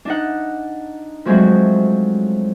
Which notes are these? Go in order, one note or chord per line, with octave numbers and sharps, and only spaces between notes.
D4 D#4 F#5
F3 F#3 G#3 A3 C4 F#4